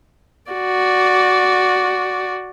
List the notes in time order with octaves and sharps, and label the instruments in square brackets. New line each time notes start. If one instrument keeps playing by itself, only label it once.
[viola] F#4 D5